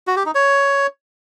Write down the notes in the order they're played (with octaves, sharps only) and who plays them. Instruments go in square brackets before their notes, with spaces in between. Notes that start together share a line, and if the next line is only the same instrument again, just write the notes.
[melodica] F#4
G4
D#4
C#5